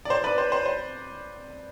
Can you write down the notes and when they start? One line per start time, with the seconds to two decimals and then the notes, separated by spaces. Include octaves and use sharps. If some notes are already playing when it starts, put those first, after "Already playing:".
0.05 D5
0.10 C5
0.24 B4 D5
0.38 C5
0.52 C5
0.66 C5